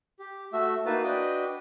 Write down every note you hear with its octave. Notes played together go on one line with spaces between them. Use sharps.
G4
A3 F#4 E5
A#3 D#4 E4 F#4 B4 A5
D4 F#4 B4 D#5 G5